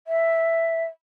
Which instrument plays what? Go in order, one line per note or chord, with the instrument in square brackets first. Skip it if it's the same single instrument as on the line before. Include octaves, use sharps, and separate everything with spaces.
[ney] E5